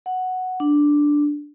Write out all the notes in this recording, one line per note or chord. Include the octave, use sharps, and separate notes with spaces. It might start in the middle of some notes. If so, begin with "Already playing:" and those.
F#5
D4